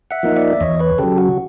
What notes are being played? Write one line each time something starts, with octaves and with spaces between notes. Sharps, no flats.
E5 F#5
F3 A#3 D#4
D5 E5
E2 C#5 D#5
B4 C#5
C#3 F#3 G4 A4
F#4